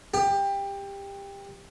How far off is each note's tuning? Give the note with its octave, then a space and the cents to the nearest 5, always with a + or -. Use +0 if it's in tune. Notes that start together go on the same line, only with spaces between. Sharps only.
G4 +20